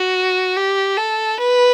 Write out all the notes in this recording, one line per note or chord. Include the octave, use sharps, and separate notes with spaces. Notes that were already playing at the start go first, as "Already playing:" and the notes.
Already playing: F#4
G4
A4
B4